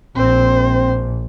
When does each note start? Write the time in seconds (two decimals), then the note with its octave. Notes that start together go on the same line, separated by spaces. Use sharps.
0.16 A#1 C4 C5